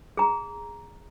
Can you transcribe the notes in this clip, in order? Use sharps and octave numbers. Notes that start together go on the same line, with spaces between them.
G#4 A#5